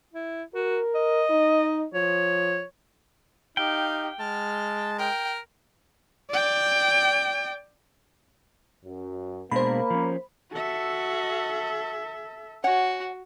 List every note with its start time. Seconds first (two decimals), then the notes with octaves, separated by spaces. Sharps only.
0.13 E4
0.54 F#4 A#4
0.95 D#5
1.30 D#4
1.94 F3 C#5
3.57 D#4 G4 F5 G5
4.20 G#3 A5 F6
4.99 A#4 G5
6.31 D5 G5
8.85 F#2
9.51 B2 G#3 A#3 D4 C5 B5
9.90 F3 C#4
10.53 F#4 A4 E5
12.64 F#4 C#5 F#5 G#5